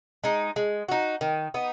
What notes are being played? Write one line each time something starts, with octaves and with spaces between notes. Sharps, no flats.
G#3 D#4
G#3
D#4 F#4
D#3
B3 D#4